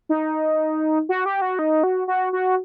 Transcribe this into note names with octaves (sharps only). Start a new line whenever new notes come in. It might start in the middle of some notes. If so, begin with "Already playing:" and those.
D#4
F#4
G4
F#4
D#4
F#4
F#4
F#4